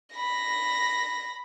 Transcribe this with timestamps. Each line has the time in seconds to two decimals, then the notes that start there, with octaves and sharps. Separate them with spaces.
0.15 B5 A#6